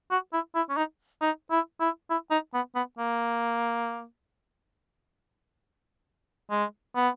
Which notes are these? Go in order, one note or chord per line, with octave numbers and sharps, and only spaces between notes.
F#4
E4
E4
C#4
D#4
D#4
E4
E4
E4
D#4
B3
B3
A#3
G#3
B3